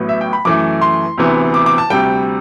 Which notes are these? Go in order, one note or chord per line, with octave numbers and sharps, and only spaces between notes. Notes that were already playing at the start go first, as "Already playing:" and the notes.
Already playing: A1 A2 F#3 B3
E5
G5
B5
F#2 E3 A3 D6
C6
D2 C3 E3 B3
D6
D6
A5
D2 C3 G3 G5